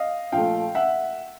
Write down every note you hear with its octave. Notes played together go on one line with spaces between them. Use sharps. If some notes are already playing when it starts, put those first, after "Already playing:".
Already playing: D#5 F5
A#2 F3 A3 F5 G5
E5 F#5